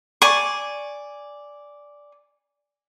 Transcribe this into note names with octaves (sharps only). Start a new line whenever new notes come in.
D5 G#5 C#6